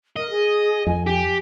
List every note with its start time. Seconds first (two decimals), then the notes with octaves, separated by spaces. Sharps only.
0.16 A#4 D#5
0.30 G#4
0.87 F2 G#5
1.07 G4 G#5